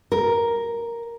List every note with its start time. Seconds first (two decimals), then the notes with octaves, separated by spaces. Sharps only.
0.12 A#4